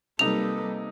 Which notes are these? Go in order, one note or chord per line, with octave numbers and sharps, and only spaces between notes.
C3 G3 A#3 D#4 A4 B4 F7